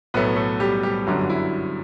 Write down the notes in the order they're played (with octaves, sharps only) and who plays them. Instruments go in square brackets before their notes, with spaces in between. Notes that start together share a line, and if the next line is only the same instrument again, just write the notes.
[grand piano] B1 A2 F#3 A3 B3 B4
A3 A4
G3 G4
G3 G4
G1 F#2 D3 F#3 G3 F#4
E4